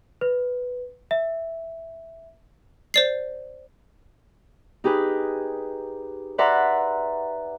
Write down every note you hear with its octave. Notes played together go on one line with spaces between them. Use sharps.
B4
E5
C5 D5 C7
D#4 G4 G#4 B4
B4 D5 E5 F#5 A#5 C6